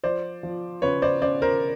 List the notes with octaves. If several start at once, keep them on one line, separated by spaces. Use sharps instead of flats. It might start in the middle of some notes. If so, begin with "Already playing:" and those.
F3 C5 D5
F3
C#3 B4 C#5
C5 D5
C#3 C5 D5
A#4 C5